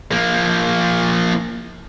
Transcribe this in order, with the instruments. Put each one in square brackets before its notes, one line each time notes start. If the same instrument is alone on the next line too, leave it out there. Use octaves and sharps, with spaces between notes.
[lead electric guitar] F3 A#3